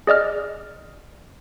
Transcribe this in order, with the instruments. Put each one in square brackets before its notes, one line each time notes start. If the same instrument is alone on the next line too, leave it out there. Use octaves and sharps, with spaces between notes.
[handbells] G#4 D5 D#5 F6